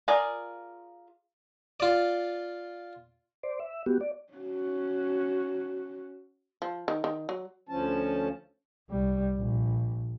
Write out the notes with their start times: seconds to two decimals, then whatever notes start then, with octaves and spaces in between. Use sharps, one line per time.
0.08 F4 G#4 A#4 D5 A#5
1.80 F4 D5
3.43 C5 D5
3.60 E5
3.86 B3 F#4 G4
4.01 D5
4.33 C#4 F#4
6.62 F3
6.88 D#3
7.04 D#3
7.29 F#3
7.69 D2 F3 C#4 A5
8.90 C2 G3
9.38 A#1